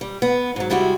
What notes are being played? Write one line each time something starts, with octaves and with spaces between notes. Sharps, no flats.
G3
B3
G#2 F#3
C3 G3 G#3 E4 F#4